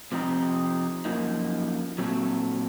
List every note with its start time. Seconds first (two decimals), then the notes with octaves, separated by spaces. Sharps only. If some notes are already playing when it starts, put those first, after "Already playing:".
0.12 C3 F3 C4 D#4
1.05 F#2 F3 A#3 D#4
1.98 A#2 F#3 A3 C4